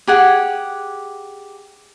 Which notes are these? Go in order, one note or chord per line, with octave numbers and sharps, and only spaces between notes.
G4 G#4 F#5